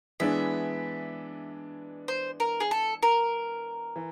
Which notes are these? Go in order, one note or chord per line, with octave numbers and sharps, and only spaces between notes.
E3 G#3 B3 D4 E5
C5
A#4
G#4
A4
A#4
E3